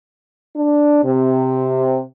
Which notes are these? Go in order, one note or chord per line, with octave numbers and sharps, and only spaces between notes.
D4
C3